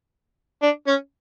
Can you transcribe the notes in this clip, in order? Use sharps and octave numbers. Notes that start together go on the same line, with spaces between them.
D4
C#4